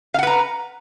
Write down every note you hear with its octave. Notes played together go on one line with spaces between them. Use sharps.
B4 F5 F#5 A#5